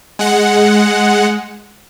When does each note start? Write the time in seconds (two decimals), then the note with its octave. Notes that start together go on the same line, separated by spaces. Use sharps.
0.19 G#3 F#5